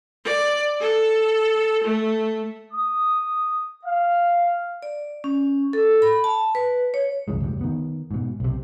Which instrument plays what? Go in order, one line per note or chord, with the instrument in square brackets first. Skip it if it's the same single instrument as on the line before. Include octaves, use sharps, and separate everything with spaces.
[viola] D5
A4
A3
[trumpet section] D#6
F5
[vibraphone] D5
C#4
A4
B5
A5
B4
C#5
[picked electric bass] C2 F#2 E3 G#3
F1 D2 G2
D#3 B3
G#2 B2
B1 C3